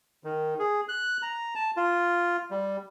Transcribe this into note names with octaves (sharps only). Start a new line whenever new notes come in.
D#3
G#4
F#6
A#5
A5
F4
G3